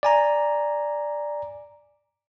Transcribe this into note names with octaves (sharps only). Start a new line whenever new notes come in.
D5 G#5 A#5